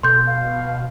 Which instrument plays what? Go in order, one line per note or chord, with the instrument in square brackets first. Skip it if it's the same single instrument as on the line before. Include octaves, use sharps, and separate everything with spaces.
[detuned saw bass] B2 [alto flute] A4 [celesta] C6 G6
[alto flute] F5